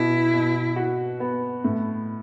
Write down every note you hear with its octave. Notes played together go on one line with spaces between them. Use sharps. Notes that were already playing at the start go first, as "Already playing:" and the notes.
Already playing: B2 E4
B2
F#4
B3
A2